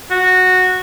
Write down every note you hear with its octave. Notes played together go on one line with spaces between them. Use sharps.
F#4